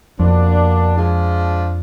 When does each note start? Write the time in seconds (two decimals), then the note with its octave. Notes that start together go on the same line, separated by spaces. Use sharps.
0.19 F2 B2 A#3 D4
0.96 F3 G#3 D4